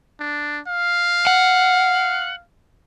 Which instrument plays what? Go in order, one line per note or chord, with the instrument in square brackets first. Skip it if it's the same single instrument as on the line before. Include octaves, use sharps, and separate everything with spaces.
[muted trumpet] D4
F5
[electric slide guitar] F#5